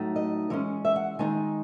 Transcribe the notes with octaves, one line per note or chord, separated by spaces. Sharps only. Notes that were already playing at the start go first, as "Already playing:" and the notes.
Already playing: A2 F#3 A3 D#4
D#5
E3 G#3 C#4
E5
F#5
D#3 G#3 D#4 G#5